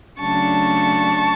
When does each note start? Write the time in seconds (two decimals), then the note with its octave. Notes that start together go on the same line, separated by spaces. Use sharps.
0.19 C#3 F#3 A3 D4 A5 C#6